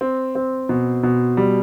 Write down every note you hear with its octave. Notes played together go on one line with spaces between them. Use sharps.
C4
C4
B2
B2
G3